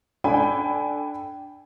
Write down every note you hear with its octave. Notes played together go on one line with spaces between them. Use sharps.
D4 A4 G5 G#5 B5